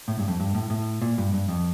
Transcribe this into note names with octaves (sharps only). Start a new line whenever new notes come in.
A2
G2
F2
G2
A2
A2
A#2
G2
G2
F2